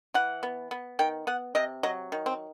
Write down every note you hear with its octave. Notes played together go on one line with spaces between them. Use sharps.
E3 F#5
B3
B3
D#3 G5
B3 F#5
C3 D#5
F#3 D#5
D#3
C4